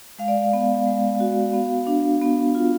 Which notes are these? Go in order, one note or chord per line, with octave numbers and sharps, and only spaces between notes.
G#3 F5
D5
F5
B3
G#3
F#4
B3 F5
D4
B3
F4